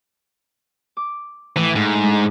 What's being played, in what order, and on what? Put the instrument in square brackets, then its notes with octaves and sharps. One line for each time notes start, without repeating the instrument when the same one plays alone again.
[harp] D6
[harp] A2 [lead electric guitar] E3
[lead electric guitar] G#2
[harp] G#3 D4